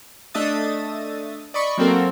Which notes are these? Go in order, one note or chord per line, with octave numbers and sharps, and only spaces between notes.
A3 D4 D#5 E5 D#6 A6
D5 D#5 B5 C#6
F#3 A#3 C4 F#4 A4 A#4